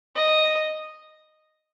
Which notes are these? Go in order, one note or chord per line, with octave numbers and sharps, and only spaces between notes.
D#5